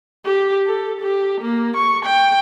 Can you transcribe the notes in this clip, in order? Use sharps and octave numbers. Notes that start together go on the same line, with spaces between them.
G4
A4
G4
A#3
C#6
G5